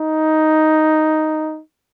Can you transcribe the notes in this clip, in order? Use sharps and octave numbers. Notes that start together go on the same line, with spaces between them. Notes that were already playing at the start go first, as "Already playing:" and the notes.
Already playing: D#4